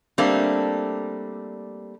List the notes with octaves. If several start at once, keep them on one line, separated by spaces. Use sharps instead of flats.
G3 A3 A#3 C4 D4